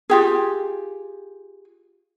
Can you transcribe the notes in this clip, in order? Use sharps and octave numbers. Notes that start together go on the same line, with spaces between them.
F4 G4 G#4